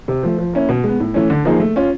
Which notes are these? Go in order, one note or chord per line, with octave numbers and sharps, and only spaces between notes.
C3
F3 A3
F3
A#3 C#4 E4
B2
G#3 B3
A2
E3 A3 C#4
D3
F3 A#3 D#4 G#4
A3
C#4 F4